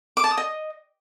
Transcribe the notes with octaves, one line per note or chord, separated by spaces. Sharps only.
D6
A5
D#6
D#5